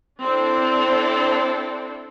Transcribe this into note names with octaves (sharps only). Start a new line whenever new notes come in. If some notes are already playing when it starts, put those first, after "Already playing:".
C4 D4 E4 A4